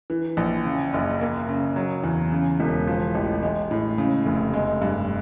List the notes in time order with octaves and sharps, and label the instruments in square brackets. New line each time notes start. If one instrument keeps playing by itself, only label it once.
[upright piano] E3
A#1
C#3
F#1
A#3
C#3
F#3
E2
C#3
E1
F3
A1
G#3
A2
C#3
F1
G#3
G2